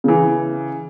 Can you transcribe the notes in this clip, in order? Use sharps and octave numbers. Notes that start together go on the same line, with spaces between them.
C#3 E3